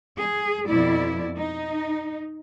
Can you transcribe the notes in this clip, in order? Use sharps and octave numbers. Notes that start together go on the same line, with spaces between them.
G#4
F2 B2 E4 D5
D#4